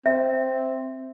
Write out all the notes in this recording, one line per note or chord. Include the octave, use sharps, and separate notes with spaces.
C4 E5